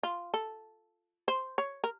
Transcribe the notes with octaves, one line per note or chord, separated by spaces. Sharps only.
F4
A4
C5
C#5
A#4